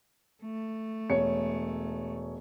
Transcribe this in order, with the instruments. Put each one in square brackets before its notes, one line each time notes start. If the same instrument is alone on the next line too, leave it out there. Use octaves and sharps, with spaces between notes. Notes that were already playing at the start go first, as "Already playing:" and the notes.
[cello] A3
[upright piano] E1 C#5 C#7